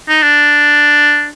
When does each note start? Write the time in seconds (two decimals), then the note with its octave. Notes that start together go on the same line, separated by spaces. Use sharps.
0.09 D#4
0.23 D4